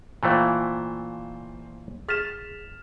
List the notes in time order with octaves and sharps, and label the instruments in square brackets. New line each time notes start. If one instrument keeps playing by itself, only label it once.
[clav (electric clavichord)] A#2 E3 A3 [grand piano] F4 C5 [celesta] F5 G5 G#5
[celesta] G#4 A6 B6 [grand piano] F6 E7